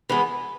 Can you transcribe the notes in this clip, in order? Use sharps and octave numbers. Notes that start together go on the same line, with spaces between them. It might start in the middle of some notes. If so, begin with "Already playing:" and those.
E3 G#3 B3